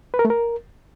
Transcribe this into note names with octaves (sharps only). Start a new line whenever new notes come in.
B4
A#4
A3
A#4